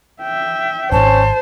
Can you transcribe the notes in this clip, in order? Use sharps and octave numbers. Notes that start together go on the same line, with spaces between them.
E5 G5
D1 G#1 C#4 C5 A5